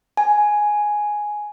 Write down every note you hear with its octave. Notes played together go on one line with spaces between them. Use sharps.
G#5